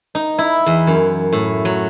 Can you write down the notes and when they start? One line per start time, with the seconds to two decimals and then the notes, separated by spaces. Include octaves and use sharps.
0.15 D#4
0.38 E4
0.66 E2
0.87 F#2
1.33 A2
1.65 F#3